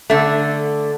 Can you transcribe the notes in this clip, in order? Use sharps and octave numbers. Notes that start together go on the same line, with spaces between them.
D3 A3